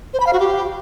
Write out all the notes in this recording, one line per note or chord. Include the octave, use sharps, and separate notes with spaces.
C5
B5
F5
F#4
G4